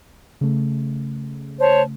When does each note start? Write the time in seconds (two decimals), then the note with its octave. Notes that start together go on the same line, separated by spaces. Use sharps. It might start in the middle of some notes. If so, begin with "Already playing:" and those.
0.41 C#3 A3
1.59 C5 C#5 A5